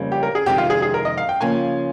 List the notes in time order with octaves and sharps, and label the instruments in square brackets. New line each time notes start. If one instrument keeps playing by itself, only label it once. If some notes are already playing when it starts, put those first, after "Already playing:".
Already playing: [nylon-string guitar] F2 C#3 G3 A#3
[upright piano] G4
A#4
G#4
[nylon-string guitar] F2 C3 D#3 G#3 D#4 [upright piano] G4
[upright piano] F4
G#4
G#4
A#4
D#5
F5
G5
[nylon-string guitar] C#3 F3 A#3 C#4 [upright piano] G#5